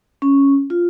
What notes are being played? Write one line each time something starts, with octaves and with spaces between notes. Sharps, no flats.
C#4
F4